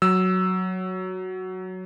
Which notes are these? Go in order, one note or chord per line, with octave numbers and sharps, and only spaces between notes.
F#3 E6